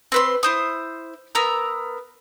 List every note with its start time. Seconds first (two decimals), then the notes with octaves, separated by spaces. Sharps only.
0.12 C4 B4 C6
0.43 E4 C5 D#6
1.35 B3 A#4 A#5 E6